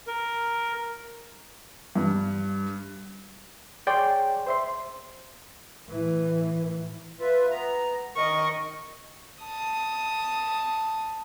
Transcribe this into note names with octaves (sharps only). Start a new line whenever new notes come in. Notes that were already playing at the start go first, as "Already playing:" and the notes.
A#4
G2
G#4 C#5 D5 G5 C6
C5 E5 C6
A2 E3
F4 B4 E5
B3 A#5
D#3 A#4 D#5 C#6
A5 D#6